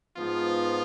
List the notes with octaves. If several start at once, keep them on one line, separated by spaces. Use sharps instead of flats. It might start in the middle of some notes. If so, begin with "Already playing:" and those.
G#2 F3 B3 F4